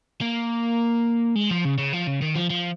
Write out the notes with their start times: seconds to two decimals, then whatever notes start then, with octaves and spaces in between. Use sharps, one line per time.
0.21 A#3
1.36 G#3
1.51 F3
1.65 C#3
1.78 C#3
1.93 F3
2.07 C#3
2.22 D#3
2.36 F3
2.50 F3